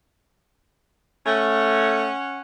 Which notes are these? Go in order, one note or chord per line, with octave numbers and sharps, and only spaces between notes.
A3 C#4 F#5